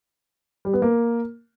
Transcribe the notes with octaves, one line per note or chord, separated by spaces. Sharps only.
G3
B3
A#3